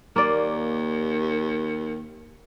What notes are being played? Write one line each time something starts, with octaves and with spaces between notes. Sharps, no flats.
D#2 A#3 D5